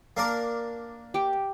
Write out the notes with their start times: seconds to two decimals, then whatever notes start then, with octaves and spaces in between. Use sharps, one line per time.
0.17 A#3 D4 A#4
1.14 G4 D6